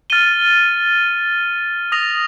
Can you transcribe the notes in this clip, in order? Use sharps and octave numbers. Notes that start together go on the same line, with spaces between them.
F6 A6 D#7 G7
D#6 A#6 F7